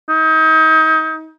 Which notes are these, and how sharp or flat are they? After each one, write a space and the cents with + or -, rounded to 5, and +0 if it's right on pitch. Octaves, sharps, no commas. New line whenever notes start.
D#4 +30